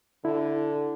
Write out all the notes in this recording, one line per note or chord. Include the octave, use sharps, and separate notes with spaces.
D3 E4